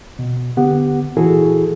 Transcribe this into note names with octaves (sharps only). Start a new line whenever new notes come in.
B2
D3 B3 G4 F#5
A#2 E3 E4 F#4 G#4 A4